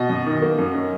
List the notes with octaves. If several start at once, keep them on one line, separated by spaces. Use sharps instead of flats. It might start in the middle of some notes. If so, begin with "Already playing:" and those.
Already playing: B2 D#5
F#2
D#3
A#3
F#2
C#4